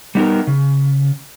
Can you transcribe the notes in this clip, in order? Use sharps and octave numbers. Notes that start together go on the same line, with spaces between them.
G3 B3 D#4 G4 A#4
C#3